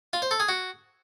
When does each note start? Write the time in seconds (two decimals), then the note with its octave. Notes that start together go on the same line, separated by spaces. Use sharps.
0.13 F4
0.22 C5
0.31 A4
0.40 G#4
0.49 F#4